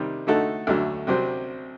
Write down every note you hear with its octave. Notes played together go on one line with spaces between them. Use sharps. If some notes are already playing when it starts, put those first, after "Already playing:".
Already playing: C3 D#3 G3
D3 A3 D#4 F#4 A4
D2 D3 F#3 A3
C2 C3 F#3 C4